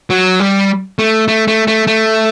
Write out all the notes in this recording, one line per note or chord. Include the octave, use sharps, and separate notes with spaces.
F#3
G3
A3
A3
A3
A3
A3